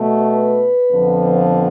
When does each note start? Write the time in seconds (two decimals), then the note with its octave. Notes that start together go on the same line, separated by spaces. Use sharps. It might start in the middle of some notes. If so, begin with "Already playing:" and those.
Already playing: B2 A3
0.22 B4
0.91 F2 D3 F3 B3